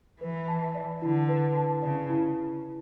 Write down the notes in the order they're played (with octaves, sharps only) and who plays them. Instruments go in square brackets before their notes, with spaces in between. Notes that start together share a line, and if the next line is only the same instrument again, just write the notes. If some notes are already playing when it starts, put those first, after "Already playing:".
[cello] E3 [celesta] B4
[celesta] A5
D5
[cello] D3 [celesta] E4
[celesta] B4
A5
[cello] C#3 [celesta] D5
[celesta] E4